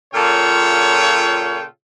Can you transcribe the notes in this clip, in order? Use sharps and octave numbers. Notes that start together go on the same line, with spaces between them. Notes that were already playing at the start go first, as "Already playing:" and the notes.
A#2 C#3 F4 A4 C#5 G5